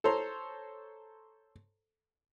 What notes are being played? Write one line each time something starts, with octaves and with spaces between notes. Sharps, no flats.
A4 C5 C#5 A#5 C6